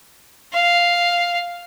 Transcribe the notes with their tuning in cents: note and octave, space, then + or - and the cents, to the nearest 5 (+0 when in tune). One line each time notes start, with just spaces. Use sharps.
F5 +0